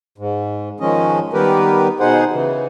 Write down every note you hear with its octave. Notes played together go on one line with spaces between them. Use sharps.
G#2
D#3 F3 G#3 C#4 D#5
D#3 G3 B3 G4 A#4 B4
B2 D#4 G#4 C5 F#5
C#3 E3